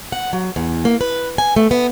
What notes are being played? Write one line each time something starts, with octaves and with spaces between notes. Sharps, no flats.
F#5
F#3
E2
A#3
B4
G#5
A3
B3